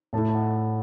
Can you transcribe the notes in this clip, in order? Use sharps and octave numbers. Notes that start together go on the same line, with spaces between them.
A2 A3 E4 A5
A5
F#5